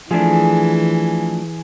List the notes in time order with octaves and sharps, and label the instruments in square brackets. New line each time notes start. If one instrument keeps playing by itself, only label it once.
[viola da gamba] E3 [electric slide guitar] F3 A3 D4 [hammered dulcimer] G#4